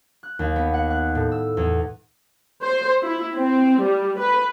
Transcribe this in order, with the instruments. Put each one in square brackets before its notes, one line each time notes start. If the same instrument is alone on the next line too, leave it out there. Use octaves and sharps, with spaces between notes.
[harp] F#6
D#2
B3
F#5
F#6
A2
E6
E2
[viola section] C5
E4
C4
G3
B4